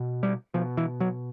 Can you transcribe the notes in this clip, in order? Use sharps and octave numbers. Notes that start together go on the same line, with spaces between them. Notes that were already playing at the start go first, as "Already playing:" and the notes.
Already playing: B2
G3
B2 F3
E3
F#3